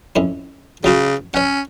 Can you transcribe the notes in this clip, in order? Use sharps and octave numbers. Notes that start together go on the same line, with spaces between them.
F2 C#4 E4
C#3 F#3 F4 F#4
C#4 C#5 F#5